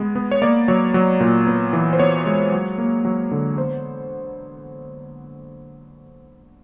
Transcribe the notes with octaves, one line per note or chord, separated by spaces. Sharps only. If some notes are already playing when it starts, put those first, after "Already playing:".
Already playing: G#3 B3
B3
C#5
A#3 D5
F#3 C#5
F#3
A#2
B3
E3
C5
B3 C#5
G#3
F#3
A#3
F#3
D3
B3 C5